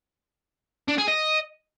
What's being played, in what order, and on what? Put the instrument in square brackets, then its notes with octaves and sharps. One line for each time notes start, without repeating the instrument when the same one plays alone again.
[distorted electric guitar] D4
G#4
D#5